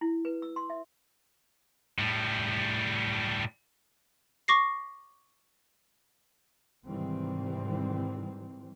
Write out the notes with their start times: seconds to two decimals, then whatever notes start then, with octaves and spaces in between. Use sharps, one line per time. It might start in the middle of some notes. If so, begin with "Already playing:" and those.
0.01 E4
0.25 B4
0.42 E6
0.56 C6
0.70 E5
1.99 A2 G3
4.48 C#6 D6 A#6 C7
6.85 G#2 C3 D#3 E3 G3 C4